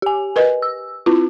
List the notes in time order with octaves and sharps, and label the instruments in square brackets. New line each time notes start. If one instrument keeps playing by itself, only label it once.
[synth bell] G4 G#5
[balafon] A#4 B4 D#5
[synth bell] E6
[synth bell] C4 F4 [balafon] E4